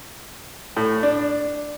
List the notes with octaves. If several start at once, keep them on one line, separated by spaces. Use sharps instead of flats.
A2
D4